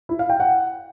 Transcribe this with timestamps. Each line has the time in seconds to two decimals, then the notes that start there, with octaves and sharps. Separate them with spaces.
0.09 E4
0.19 F5
0.30 G5
0.40 F#5